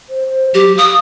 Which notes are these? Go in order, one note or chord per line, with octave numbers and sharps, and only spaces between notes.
C5
F#3 G4
F5 D#6